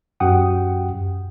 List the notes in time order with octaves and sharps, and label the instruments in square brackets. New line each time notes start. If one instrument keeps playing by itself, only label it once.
[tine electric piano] F#2 F#4 G4 F#5 G5 D#6